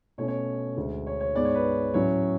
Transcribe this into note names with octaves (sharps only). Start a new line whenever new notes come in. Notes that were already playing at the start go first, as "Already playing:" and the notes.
B2 A3 C#4 C#5
C#5
D2 D3 G#3
C#5
C#5
G#2 G#3 B3 D5
C#5
B4
A2 F#3 C#4 C#5